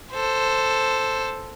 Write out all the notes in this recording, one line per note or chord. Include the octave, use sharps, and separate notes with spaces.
A4 C5